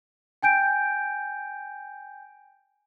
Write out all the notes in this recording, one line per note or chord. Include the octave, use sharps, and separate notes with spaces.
G5 G#5 G6 D7